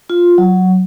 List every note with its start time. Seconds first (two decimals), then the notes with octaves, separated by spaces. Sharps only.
0.10 F4
0.38 F#3